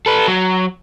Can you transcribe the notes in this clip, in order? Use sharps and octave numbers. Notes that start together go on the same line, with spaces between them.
A4 B4
F#3